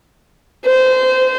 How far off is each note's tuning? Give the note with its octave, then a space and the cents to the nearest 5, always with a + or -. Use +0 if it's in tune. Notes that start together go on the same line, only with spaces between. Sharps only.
C5 -20